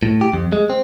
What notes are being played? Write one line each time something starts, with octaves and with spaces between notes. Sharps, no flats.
A2
G4
F2
G#3
C4